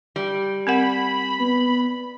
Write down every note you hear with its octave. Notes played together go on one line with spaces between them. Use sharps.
G3
C4 A#4 F#5 B5
B3